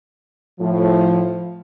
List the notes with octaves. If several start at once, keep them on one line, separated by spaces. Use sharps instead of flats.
A2 F3